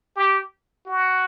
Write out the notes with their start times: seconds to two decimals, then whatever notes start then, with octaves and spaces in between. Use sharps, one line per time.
0.16 G4
0.86 F#4